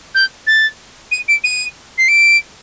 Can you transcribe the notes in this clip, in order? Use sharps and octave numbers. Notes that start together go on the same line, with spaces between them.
G6
A6
D#7
D7
D#7
C7
D7